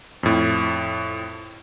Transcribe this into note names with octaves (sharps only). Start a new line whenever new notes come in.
F2 A2